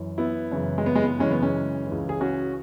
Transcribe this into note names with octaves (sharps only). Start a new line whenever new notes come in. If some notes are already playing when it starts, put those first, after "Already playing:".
Already playing: F#2 E3
B3 E4
F#2 C#3 E3
G#3
B3
G#3
B3
F#2 C#3 E3 G#3 C#4
B3
G#3 C#4
C#2 C#3 E3
G#4
C#4 F#4